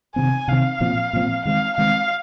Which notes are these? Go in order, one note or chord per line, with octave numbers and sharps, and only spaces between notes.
C3 D#3 C4 G#5
C3 D#3 C4 F5
A#2 F3 C4
A#2 F3 C4
D#3 G#3 C4 F5
D#3 G#3 C4 F5